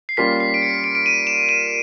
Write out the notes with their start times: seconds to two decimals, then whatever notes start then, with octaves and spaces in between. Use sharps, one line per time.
0.09 C7
0.17 G3 A#3 C#4 F4 B6
0.40 C7
0.54 D7
0.62 C#7
0.84 D7
0.95 D7
1.06 D#7
1.27 E7
1.49 D#7